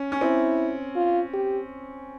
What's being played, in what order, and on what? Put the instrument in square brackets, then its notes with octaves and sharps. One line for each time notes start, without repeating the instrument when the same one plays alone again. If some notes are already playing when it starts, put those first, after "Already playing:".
Already playing: [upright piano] C#4
C#4
[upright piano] C4 [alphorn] E4
[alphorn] F4
G4